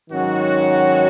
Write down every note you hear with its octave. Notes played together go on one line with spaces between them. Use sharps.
G#2 D#3 F#3 C#4 F#4